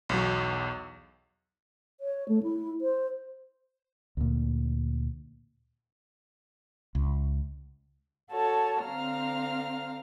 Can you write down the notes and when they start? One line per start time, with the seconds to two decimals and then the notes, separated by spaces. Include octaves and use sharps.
0.09 B1 E2 F#3
2.00 C#5
2.28 A3
2.43 E4
2.81 C5
4.17 D2 A#2
6.95 C#2
8.32 F#4 A4 C#5 A5
8.84 D3 C4 F5 A#5 F6